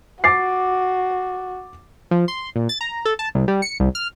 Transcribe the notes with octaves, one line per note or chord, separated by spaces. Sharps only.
F#4 D6 A6 C7
F3
C6
A#2
A6
A#5
A4
A5
C2
G3
C#7
C2
F6